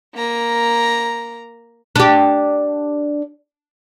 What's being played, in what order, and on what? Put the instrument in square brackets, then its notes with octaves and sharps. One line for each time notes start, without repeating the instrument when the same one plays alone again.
[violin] A#3 A#5
[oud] D4 G4